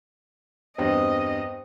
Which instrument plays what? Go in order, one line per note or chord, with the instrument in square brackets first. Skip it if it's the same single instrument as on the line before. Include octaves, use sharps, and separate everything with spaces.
[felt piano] E2 G2 C4 [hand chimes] C5 G5 A#6 [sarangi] D#5